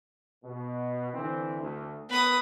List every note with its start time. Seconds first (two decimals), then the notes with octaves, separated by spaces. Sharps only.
0.45 B2
1.13 D3 E3 C4
1.62 D2
2.10 B3 B4 D#6